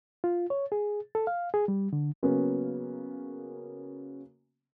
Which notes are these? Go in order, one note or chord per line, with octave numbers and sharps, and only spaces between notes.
F4
C#5
G#4
A4
F5
G#4
G3
D3
C#3 F#3 A#3 B3 C#4